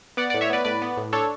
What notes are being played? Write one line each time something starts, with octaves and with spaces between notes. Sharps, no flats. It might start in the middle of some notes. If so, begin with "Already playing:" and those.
B3 D5 F#5
D5 F#5
A2
C#5 E5
B3 B4 D5
A2 B4 D5
B3
A2
D4 A4 C#5